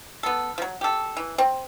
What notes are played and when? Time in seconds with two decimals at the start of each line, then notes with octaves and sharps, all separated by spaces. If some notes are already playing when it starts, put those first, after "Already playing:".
0.23 B3 A4
0.58 F3 F#3
0.81 G4 A4
1.17 E3
1.38 C4